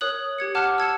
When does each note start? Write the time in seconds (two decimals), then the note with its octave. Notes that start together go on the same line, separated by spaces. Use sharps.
0.01 A#4 C#5 D#6 F#6 F#7
0.38 G4 G#6 C#7
0.55 F#5 A5 D6 F6 F#6
0.78 E6 G#6 C#7 E7